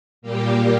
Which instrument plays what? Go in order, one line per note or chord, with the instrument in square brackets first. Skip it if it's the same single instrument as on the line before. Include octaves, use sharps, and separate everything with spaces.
[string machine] A#2 G3 A#3 G4